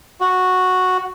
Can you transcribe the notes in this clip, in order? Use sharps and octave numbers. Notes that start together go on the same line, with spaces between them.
F#4